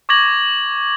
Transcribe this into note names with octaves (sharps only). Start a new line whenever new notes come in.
C#6 D6 G#6 A#6 F#7